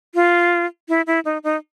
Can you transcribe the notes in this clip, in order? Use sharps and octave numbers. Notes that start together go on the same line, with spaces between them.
F4
E4
E4
D#4
D#4